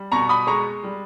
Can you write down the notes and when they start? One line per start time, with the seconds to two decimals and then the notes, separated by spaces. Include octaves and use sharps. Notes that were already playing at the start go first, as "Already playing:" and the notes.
Already playing: G3
0.12 B2 A#5 C#6
0.29 B5 D#6
0.47 G#3 A#5 C#6
0.83 G3